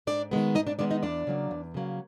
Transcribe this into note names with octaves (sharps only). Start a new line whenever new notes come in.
G#2 D4 D5
D#3 G#3 B3
G#2 D#4 D#5
D4 D5
D#3 G#3 B3 D4 D5
D#4 D#5
E2 D4 D5
C#3 F#3 A#3
E2
C#3 F#3 A#3